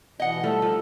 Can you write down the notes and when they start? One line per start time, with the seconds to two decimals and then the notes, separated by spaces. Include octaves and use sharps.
0.20 B2 E3 D#5 F#5
0.43 F3 G3 A3 A4
0.62 F3 D#4